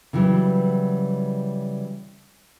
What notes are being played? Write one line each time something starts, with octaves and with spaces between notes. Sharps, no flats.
C#3 E3 F#3 G3